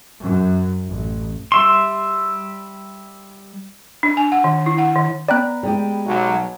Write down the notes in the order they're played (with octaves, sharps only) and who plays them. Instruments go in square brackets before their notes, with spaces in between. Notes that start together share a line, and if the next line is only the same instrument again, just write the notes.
[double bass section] F#2
A1
[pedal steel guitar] G3 E5 C6
[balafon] D4
G#5
F#5
D#3
E4
F#5
D#3
[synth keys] B3 A#5 B5 [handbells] D5 G5 F#6
[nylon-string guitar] G3 G#3 G4
[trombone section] B1 F#3